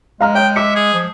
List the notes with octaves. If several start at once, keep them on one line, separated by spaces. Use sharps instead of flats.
G#3 F5 A#5 F6
C#5 D#5 G5
E5 D6 C#7
G#4
F3